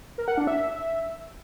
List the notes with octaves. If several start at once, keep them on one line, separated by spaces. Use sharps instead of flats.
A#4
F#5
D4
E5